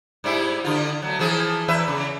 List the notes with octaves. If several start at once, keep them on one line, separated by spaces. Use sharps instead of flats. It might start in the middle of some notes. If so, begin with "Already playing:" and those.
G#2 G3 E4
D3 F4
F#3 A3
E3 F3 G#4
E2 B4 E5
C#3